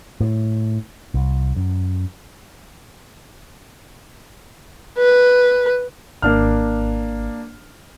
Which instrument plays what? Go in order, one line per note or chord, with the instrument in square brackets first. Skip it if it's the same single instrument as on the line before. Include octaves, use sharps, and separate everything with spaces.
[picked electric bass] A2
C2
F#2
[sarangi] B4
[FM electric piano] G#1 [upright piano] A#3 D4 F6